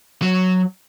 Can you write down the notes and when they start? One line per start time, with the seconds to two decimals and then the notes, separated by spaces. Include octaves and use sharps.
0.22 F#3